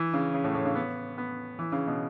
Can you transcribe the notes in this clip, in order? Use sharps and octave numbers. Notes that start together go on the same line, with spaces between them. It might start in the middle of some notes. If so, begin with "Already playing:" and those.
Already playing: E3
C#3
C#3
A2
A2
C#3
B3
B3
E3
C#3
B2